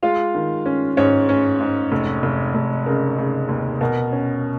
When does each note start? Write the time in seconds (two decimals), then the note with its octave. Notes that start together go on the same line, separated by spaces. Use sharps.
0.03 G#3 F4 F5
0.35 D#3
0.66 C#4
0.97 G#2 C#4 C#5
1.29 C#4
1.60 G#2
1.92 F1
2.23 F1
2.55 F1
2.86 C#3 A#4
3.18 C#3
3.49 D#2
3.81 B2 A#4
4.12 C#4